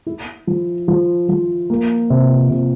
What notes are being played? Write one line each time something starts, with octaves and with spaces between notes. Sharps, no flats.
E4
F3
F3
F3
A#3
C3
C3